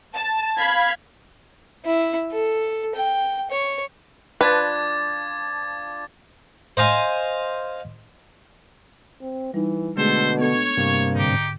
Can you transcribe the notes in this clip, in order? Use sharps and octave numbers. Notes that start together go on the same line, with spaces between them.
A5
F5 B5 G#6
E4
A4
G5
C#5
F3 D4 B4 D6 G#6 A6
C5 D#5 F5 G#5
C4
E3 G3 D#4
B2 D3 G#3 A3 G#4 A4 C5
B3 D4 A4 C#5
G2 C3 A#3
G#2 D3 D#4 G4